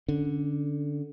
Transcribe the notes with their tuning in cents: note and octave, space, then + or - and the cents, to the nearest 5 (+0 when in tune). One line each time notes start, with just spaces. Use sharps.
D3 +0 C#4 +10